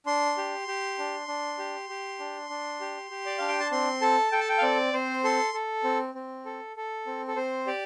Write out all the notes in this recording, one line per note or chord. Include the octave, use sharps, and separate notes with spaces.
D4 C6
G4
G4
D4
D4
G4
G4
D4
D4
G4
G4
D5
D4 F5
G5
A5
C4 C6
A4 A5
A4 G5
A5
G5
F5
C4 D5
C4 C5
A4 C6
A4
C4
C4
A4
A4
C4
A4
C4 C5
G4 D5